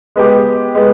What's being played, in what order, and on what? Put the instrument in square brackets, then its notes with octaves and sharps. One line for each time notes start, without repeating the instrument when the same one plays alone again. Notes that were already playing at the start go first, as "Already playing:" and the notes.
[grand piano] G#3 B3 G4
G#3 B3